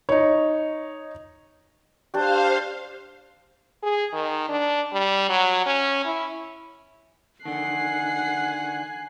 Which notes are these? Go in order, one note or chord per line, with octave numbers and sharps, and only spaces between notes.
D#4 C#5
D4 G4 C5 F5
G#4
D#3
D4
G3
F#3
C#4
E4
D3 D#3 F#5 G#5 F#6 C7